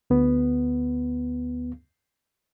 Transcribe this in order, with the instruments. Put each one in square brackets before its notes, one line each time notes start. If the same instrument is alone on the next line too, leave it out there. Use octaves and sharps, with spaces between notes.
[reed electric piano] D2 B3